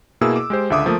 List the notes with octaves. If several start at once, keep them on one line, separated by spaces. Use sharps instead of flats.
B2 A#3 E4 G#4 E6
D6
G#3 G4 C5
C#2 D3 E5 D6 D#6
F3 A3 A#3